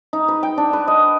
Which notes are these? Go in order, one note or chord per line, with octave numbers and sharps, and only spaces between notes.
D#4
B4
G5
D4
B4
D#5